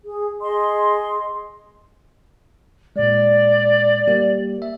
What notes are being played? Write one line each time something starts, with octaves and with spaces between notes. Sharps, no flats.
G#4
G#4 D#5 C6
A#2 G#3 D5
G3 A#3 G4
E5